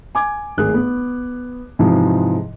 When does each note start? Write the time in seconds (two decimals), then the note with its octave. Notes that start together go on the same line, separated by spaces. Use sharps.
0.15 G#5 D6 G#6
0.57 D1 G#1 G#4 F#6
0.74 B3
1.79 G#2 C3 E3 F3 G#3